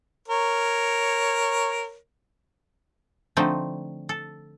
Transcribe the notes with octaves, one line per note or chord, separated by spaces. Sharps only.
A#4 C#5
D3 F3 A3 C4 D#4
A4